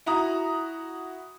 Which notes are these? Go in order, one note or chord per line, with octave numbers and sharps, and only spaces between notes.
E4 F#4 A#5 D#6